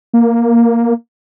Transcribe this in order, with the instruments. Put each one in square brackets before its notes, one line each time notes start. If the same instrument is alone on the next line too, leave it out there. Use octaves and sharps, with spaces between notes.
[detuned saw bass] A#3